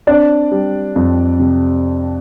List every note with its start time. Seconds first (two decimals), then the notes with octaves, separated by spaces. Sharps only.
0.07 C4 D4 D5
0.52 G3
0.96 F2
1.39 C3